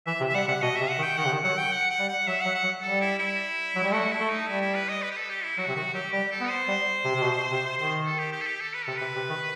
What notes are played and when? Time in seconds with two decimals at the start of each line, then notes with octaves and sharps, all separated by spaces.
0.06 E3 E5
0.21 C3
0.29 E5
0.34 G3 F#5
0.48 C3 F#5
0.62 B2 D#5
0.76 C3 E5
0.89 F#5
0.98 D#3
1.03 G5
1.17 D#3 F#5
1.25 C3
1.32 D#3
1.44 F#3 F#5
1.58 G5
1.72 F#5
1.90 F#5
1.99 G3
2.09 F#5
2.27 F#3 E5
2.41 F#3 F#5
2.55 F#5
2.64 F#3
2.82 G3 A4
3.01 E4
3.19 E4
3.76 F#3
3.84 G3
3.92 A3 F#4
4.11 E4
4.20 A3
4.29 D#4
4.47 G3 E4
4.61 E4
4.75 B4
4.89 D#5
5.02 B4
5.11 G4
5.16 A4
5.30 G4
5.44 E4
5.58 F#3 F#4
5.68 C3
5.76 D#3 F#4
5.94 F#3 G4
6.12 G3 G4
6.31 A4
6.40 B3
6.49 C5
6.68 G3
7.05 C3
7.15 C3
7.23 B2
7.50 C3
7.78 D#3 C5
8.05 A4
8.19 G4
8.33 G4
8.41 A4
8.46 G4
8.60 A4
8.74 B4
8.85 C3 A4
8.98 C3 B4
9.16 C3
9.29 D#3